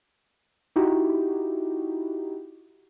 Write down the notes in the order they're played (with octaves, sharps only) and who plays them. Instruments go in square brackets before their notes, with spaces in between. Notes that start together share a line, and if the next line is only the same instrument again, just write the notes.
[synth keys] D#4 E4 F#4 G4